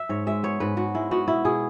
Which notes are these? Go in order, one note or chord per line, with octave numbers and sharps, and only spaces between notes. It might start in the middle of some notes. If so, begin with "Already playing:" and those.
Already playing: E5
G#2 C#5
G#3 E5
B3 C#5
G#2 B4
G#2 F#4
G#3 E4
B3 F#4
B2 E4
B2 G#4